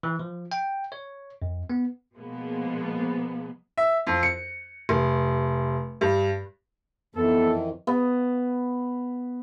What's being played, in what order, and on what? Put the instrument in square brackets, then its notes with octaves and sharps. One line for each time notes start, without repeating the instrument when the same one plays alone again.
[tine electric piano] E3
F3
G5
C#5
F2
B3
[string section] B2 F3 G#3 A#3 B3
[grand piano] E5
F2
C#7
F1
G2
[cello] F2 [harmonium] D#3 E3 [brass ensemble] B3 A4
[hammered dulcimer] B3